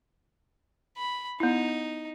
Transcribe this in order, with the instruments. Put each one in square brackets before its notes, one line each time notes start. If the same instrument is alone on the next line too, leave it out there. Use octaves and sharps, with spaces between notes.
[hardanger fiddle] B5
[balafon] B3 E4 [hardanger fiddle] D#4